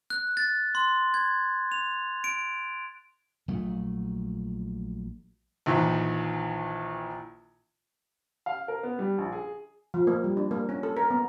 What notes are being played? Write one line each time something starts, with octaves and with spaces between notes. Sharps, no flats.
F#6
A6
C6
G#6
F7
D7
A#1 F#3 A3
A#1 D#3 E3
F5
A#4
B3
G3
A#1
G#4
F3
A#3
G3
D4
A#3
C#4
A4
A#4
B3